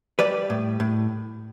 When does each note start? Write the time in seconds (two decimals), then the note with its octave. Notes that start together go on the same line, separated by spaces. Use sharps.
0.19 G3 B4 D5
0.50 A2
0.80 A2